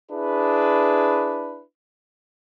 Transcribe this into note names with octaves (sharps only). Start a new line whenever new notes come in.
D4 E4 G#4 B4